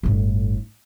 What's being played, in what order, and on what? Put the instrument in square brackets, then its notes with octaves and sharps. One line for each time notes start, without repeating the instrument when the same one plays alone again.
[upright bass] G1 A2